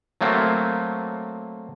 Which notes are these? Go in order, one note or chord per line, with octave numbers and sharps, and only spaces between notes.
F#3 A3 A#3 C4